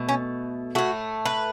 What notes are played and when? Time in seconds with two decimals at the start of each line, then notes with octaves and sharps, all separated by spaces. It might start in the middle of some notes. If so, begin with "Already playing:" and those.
Already playing: B2 A3
0.09 C#4
0.75 A2 A3 F#4
1.26 B4